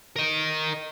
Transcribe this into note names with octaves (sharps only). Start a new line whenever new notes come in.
A#4 D#5